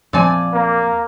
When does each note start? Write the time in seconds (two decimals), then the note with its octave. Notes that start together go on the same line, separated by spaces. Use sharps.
0.13 E2 A#2 F3 C4 D5 G#5
0.53 A#3